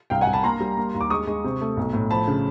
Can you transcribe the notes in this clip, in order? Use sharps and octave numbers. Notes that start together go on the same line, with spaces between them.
C2 F5 G5
F#5 G#5
C2
A5 B5
A#3 A#5 C6
G3
A#3
D#2
D6
G#3 C#6 D#6
G#3
C3
A3
B1
A2
F3 A5 B5
C#3